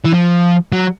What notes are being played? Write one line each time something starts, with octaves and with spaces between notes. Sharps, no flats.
E3
F3
F#3